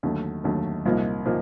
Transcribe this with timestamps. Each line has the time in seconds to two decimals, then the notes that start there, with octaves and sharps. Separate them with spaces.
0.03 D#2 D3 F#3 A3
0.44 D#2 D3 F#3 A3
0.86 C2 A#2 F3 A#3 D#4
1.25 A#2 F3 A#3 D#4